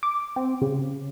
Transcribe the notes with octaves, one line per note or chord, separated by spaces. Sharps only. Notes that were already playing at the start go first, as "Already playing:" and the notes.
D6
C4
C#3